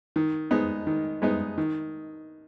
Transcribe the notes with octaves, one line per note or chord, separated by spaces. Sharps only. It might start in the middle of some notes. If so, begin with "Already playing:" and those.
D#3
G#3 B3 D#4
D#3
G#3 B3 D#4
D#3